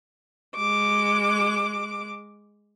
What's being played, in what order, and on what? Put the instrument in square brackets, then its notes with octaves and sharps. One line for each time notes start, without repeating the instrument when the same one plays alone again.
[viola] G#3 D6